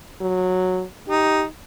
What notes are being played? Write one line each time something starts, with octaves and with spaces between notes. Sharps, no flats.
F#3
D#4 G4